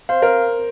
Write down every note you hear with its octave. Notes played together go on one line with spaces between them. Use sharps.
C5 F5
A#4